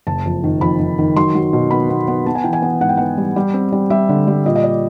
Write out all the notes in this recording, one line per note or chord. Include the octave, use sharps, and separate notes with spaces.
F#1 A5
F2
D#3
F2 B5
D#3
D#3
F#3 C6
F#3
B2
B3 B5
B3
B3
B3 A5
G#5
E3 G5
G#5
B3
G#2 F#5
G5
B3 F#5
G3
G3
C4
G3
G3 E5
D3
G3
A#2 D#5
D#5
D5